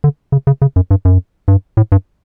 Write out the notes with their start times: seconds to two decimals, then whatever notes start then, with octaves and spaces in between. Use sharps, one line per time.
0.04 D3
0.32 C#3
0.47 C#3
0.62 C#3
0.76 F#2
0.91 G2
1.05 F#2
1.48 G2
1.77 A2
1.92 G2